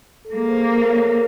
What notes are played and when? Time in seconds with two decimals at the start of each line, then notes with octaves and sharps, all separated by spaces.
0.25 A4
0.35 A#3 G#4
0.48 C5
0.62 A#4
0.75 C5
0.87 C#5